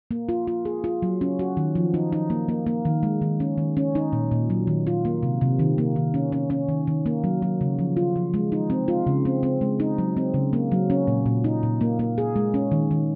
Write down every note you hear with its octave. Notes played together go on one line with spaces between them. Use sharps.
A#3
F4
F4
G#4
F4
F#3
C#4
F#4
D#3
F3
D#4
D#4
A#3
A#3
A#3
D#3
G#3
D#3
C#4
D#3
C#4
D#4
A#2
A#2
F#3
D#3
F4
A#3
C3
C3
D#3
A#3
D#3
C#4
C#4
C#4
D#3
D#3
A#3
F#3
F#3
C#3
F3
F4
F3
G#3
D#4
C4
F4
C#3
C4
C4
G#3
D#4
F#3
C4
C#3
A#3
F#3
C#4
A#2
A#2
D#4
A#2
A#3
A#3
G#4
G#3
C#4
D#3
D#3